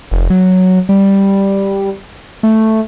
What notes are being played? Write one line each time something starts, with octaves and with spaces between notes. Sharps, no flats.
F1
F#3
G3
A3